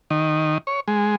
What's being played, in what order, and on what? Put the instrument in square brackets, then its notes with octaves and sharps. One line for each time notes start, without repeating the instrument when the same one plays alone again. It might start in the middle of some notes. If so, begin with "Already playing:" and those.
[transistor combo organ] D#3
C#5
G#3